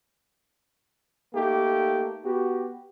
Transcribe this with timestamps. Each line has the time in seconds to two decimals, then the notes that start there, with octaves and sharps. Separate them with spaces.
1.35 A3 A#3 D#4 G4
2.25 B3 F#4 G4